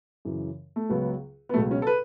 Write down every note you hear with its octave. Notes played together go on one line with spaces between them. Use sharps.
F#2 C#3 E3
A3
C#2 C#3 F#3 B3
B3
C#2 B2 F#3 A3
C#4
A4
B4